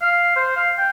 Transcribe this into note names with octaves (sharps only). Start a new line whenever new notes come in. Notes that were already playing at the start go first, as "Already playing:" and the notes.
F5
C5
F5
G5